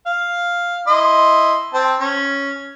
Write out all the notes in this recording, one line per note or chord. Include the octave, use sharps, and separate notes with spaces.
F5
E4 D#5 C6
C4 C5 A5
C#4